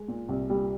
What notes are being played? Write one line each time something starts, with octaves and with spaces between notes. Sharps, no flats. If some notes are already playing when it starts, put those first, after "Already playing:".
Already playing: G#3
A#2
C2
A#2 G3